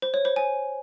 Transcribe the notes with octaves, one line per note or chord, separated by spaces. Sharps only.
C5
C#5
C5
G#5